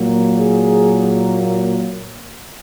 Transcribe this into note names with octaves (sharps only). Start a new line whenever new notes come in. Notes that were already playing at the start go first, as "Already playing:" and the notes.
Already playing: A#2 F#3 A#3
G#4